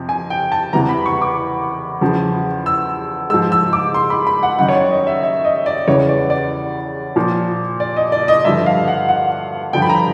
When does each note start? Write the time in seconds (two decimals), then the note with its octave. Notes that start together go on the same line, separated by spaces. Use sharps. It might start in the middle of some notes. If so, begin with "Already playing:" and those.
Already playing: F2 C3 F3
0.09 G#5
0.30 G5
0.52 A5
0.73 E2 C3 E3 A#5
0.89 B5
1.06 C#6
1.22 D6
2.01 E2 C#3 F3
2.66 E6
3.30 G#2 E6
3.34 F3
3.52 E6
3.73 D6
3.94 C6
4.10 B5
4.27 B5
4.43 F#5
4.59 F#2 D#3 F#5
4.68 C#5
4.75 D5
4.91 D#5
5.07 E5
5.23 E5
5.45 D#5
5.66 D5
5.87 E2 C#3 E3 C#5
6.09 D5
6.30 D5
7.16 A#2 F3
7.80 D5
7.96 D#5
8.12 D5
8.28 D#5
8.45 G2 D3 F3 E5
8.66 F5
8.88 F#5
9.09 F#5
9.73 G2 D3 F3 G5
9.82 B5
9.89 A#5